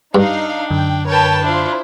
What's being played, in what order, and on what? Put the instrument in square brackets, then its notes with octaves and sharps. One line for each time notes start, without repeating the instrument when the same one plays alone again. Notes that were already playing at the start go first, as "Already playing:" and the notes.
[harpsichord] G2 [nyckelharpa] D4 [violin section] D#4 F5
[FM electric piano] F#2 D3 [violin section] G5
[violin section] A#4 B4 A5 [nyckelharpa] C#5 G5
[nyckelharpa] D4 F4 [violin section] E4 C5